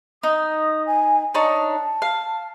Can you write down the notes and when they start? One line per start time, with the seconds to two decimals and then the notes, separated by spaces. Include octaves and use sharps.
0.23 D#4 D#6
0.86 G#5
1.34 D4 D#4 C#5 A5
2.02 F5